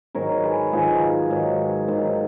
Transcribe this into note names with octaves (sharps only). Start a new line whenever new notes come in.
G#2 D#3 F#3 A#4 C#5
G#4 B4
G#2 D#3 F#3 F4 G#4
G#2 D#3 F#3
G#2 D#3 F#3